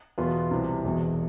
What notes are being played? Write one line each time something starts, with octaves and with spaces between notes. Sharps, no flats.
E2 B2 B3 F4
C2 C3 E3
E1 E2 B2